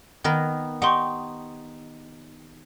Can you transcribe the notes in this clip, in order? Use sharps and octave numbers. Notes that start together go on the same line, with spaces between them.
D#3 B3 A#4
D#4 G4 F#5 C6 C#6